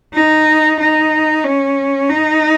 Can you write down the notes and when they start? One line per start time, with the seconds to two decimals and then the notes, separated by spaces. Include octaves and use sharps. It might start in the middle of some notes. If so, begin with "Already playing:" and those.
0.15 D#4
0.80 D#4
1.45 C#4
2.09 D#4